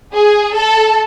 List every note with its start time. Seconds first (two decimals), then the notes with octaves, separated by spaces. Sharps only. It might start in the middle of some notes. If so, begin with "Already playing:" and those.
0.14 G#4
0.54 A4